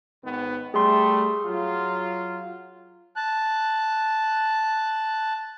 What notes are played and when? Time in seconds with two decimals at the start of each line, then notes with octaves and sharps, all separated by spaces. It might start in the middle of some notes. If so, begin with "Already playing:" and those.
0.24 G#1 D#3 B3
0.74 G3 A3 G#4 C6
1.45 F#3 F4
3.16 A5 F#6